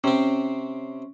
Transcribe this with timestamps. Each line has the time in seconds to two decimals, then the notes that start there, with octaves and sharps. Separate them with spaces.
0.04 C3 C4 C#4